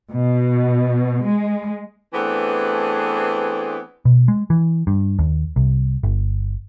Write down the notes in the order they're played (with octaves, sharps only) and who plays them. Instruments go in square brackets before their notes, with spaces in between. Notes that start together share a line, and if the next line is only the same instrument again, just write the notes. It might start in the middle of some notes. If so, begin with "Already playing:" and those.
[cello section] B2
G#3
[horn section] E3 A3 B3 C4 D4 G#4
[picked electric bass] B2
G#3
E3
G2
D#2
C2
G1